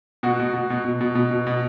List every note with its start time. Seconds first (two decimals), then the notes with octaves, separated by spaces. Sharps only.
0.23 B2 F#4
0.40 B2
0.54 B2
0.70 B2
0.85 B2
1.01 B2
1.15 B2
1.31 B2
1.47 B2